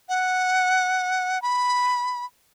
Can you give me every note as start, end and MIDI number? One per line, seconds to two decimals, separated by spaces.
0.09 1.41 78
1.42 2.25 83